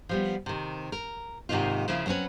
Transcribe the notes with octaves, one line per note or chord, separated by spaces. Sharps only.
F3 G3 B3
C3 D#3
A#4
G#2 C3 D#3 A#3 D#4 F4
C#3 F3 A#3 E4 G#4
F#3 A#3 C4 C#4 B4